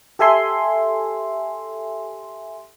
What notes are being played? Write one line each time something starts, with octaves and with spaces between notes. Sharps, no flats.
G4 A4 E5 G#5 C6